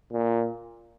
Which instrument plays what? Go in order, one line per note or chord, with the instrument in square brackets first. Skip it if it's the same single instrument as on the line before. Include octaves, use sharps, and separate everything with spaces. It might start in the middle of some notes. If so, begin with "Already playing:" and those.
[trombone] A#2